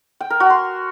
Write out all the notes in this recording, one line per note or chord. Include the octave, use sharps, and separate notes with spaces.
G5
A#4
F#4
C6